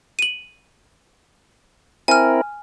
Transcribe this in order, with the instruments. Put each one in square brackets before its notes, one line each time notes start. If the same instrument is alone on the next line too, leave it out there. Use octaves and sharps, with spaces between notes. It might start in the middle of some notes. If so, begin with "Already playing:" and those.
[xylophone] D#7 F#7
[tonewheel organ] C4 E4 A#4 [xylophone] G#5 F6